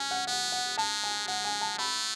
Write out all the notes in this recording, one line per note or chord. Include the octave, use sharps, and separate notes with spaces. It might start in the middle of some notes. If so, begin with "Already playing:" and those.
Already playing: C#4 G#5
F#5
B3 F#5
F#5
G#3 A5
G#5
G#3 F#5
G#5
A5
A3 B5